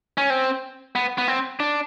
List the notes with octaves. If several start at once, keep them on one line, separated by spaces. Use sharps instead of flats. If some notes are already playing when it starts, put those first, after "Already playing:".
C#4
C4
B3
B3
C4
D4